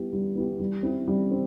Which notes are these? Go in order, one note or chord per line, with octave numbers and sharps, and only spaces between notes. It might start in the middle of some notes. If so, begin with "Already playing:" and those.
Already playing: G3 B3 E4 G4
G3
B3 E4 G4
G3
C4 E4
G3
C4